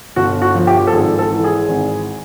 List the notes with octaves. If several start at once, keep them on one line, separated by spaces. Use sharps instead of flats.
G1 F#4
F#4
F3
G4
A4
G#1 G#4
A4
E3
G#4
G#1